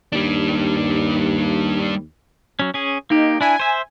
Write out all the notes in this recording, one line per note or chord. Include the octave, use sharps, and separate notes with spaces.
D#2 G3 D4
F#3 C#4
C#4 G#4
A#3 D#4 G4
D4 E4 G#5
C5 E5